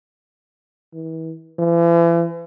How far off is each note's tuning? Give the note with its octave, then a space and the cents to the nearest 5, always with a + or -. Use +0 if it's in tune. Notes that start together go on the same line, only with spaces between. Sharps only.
E3 -35
E3 +40